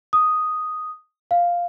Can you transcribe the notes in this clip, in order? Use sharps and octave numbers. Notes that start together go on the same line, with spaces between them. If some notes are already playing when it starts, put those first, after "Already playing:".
D#6
F5